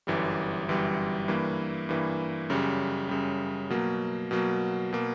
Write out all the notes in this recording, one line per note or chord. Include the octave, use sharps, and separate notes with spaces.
G1 F#2 E3 G3
G1 F#2 E3 G3
G2 E3 A#3
G2 E3 A#3
F#2 C#3 G3
F#2 C#3 G3
B2 F#3 A#3
B2 F#3 A#3
B2 A#3